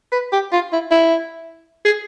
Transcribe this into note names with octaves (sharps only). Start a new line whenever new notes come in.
B4
G4
F4
E4
E4
G#4